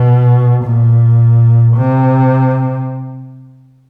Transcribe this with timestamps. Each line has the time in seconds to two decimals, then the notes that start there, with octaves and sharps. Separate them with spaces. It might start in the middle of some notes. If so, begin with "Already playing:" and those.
Already playing: B2
0.64 A#2
1.76 C3